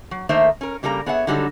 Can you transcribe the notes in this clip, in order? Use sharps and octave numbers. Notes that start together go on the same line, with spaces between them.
F#3
D#3 A3 A#3 D#4 C5 E5
C#4 A#4
C#3 G3 A#3 G4 A#5
B3 G#4 C#5 E5 F#5
D3 F#3 G3 D#4 G4 A4